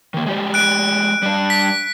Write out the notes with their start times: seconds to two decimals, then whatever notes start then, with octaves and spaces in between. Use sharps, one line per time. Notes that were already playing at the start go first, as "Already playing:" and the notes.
0.14 D#3 A#3
0.26 G#3 G4 D5
0.54 F#6 D7
1.23 G3 D4
1.50 B6